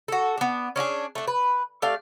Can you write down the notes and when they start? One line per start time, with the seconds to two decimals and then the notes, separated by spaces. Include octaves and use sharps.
0.08 F#4 A4
0.37 B3 D4
0.76 C#4 D4 F#4 G#4
1.15 A3 D4
1.27 B4
1.82 A3 G4 D5 F5